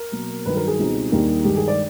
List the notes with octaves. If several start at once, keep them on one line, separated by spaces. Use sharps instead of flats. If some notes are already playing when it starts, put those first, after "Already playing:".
Already playing: A#4
B2 F#3 A#3
G2 D#3 F#3 B4
A#4
G#4
C#2 B2 G3 C4 D#4
D#2 D#3 G3 A#3 D4
G2 D#3 G#3 G4
G#4
D5